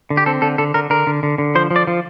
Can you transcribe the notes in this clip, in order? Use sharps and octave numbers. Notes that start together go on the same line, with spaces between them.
D3
G4
C4 A4
D3 A4
D3 A4
D3 A#4
D3 A#4
D3
D3
D3
F3 C5
F3
D5
F3